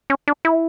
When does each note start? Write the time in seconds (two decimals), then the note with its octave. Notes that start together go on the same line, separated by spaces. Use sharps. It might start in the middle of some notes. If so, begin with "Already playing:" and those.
0.10 C#4
0.28 D4
0.45 E4